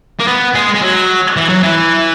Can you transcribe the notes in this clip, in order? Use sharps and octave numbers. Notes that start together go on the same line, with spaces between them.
A#3
B3
G#3
G#3
F#3
E3
F#3
E3